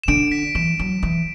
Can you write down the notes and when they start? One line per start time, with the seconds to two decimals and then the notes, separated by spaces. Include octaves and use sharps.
0.04 E7
0.08 D3 D7
0.32 B6
0.55 E3 E7
0.79 F#3
1.03 E3